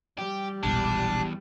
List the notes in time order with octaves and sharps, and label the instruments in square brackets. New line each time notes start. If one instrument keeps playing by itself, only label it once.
[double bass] G3 [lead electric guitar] G4
[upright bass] E1 A#1 [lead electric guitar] E2 [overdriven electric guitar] D4